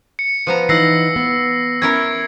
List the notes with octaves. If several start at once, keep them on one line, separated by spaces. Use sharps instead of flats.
C#7
F3 B3 A#5
E3 D#4 F5 F#5 E6 A#6 C7
B3
C#4 E4 A#4 G#6